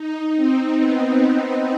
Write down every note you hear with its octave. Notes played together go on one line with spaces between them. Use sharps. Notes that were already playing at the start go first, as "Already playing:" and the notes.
Already playing: D#4
C4
B3